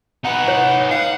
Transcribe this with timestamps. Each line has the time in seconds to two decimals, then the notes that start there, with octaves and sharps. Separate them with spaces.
0.25 D#4 B4 F#5
0.48 C#5
0.91 F5 F#5